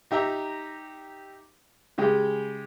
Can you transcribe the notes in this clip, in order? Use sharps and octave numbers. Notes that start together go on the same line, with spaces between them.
D#4 G4 E5 A#5
C#3 G#3 G4